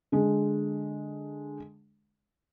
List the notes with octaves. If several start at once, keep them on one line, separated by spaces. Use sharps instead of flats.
D3 G#3